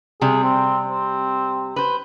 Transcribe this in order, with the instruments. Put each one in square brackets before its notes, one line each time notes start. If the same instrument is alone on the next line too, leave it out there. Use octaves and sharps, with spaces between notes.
[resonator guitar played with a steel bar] C3 G3 [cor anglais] G#4
[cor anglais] C4
C4
[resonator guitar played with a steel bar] B4 C5